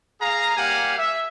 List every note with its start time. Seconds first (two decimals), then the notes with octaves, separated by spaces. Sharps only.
0.21 G#4 F5 A#5
0.56 G3 A#3 G4 F5 F#5 G#5
0.98 E5